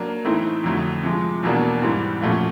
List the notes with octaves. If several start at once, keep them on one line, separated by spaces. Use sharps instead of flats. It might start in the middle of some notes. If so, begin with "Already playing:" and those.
Already playing: F#3 A#3 D4
A2 E3 A3 C4 D#4
F2 D3 F#3 A3
C3 F3 G#3
E2 B2 F#3 A#3 D4
G#2 E3 G3 C4
A#2 F3 A3 C#4 F#4